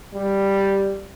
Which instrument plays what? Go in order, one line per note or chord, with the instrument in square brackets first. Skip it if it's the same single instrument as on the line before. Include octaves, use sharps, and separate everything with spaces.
[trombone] G3